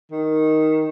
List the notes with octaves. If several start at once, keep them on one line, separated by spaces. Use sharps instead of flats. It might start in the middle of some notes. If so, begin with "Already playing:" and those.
D#3